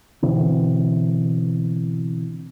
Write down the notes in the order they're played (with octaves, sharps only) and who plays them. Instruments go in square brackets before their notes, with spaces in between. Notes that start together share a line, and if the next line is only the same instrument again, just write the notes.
[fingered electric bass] B2 D3 E3 C4